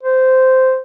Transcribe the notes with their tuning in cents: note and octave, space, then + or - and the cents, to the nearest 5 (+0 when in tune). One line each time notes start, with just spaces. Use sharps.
C5 -10